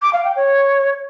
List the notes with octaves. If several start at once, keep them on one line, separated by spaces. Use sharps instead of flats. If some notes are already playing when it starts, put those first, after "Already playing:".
D6
F5
G5
C#5